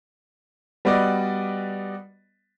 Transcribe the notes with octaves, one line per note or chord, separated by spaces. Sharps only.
G3 B3 F#4 B4 D5 D#5